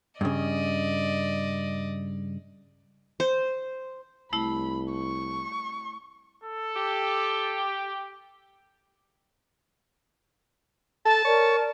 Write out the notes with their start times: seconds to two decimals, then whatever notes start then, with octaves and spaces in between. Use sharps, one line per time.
0.21 G2 C#3 D5 D#5
3.20 C5
4.33 C2 A3 E4 B5
4.92 C#6
6.44 A4
6.76 G4
11.05 A4 A5
11.25 A#4 C#5 D5